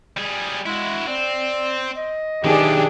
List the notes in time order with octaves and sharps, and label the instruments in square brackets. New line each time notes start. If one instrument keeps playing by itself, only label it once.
[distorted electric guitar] G3 G#4
[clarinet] G#3 [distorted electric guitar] E4 F#4
[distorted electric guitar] C4 [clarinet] D5
[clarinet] D#5
[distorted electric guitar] B1 E3 [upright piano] D#3 [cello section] D4 G4 G#4